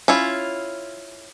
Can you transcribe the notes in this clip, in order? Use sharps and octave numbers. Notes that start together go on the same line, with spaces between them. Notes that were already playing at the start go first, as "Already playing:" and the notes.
C#4 E4 F4